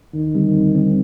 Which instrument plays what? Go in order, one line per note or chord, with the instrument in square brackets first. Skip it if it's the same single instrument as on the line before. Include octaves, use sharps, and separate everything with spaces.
[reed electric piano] D#2 [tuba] D#3
[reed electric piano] D3 G3 C4
D#2
D3 G3 C4